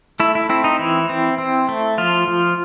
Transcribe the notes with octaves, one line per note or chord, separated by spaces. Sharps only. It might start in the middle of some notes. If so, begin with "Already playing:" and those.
A3 E4
E4
C4 E4
D#4
E3 E4
C4
C4
A3
F3 F4
F3